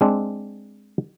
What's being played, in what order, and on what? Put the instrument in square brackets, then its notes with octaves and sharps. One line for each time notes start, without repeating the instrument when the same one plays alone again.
[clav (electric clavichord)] G#3 C4 D4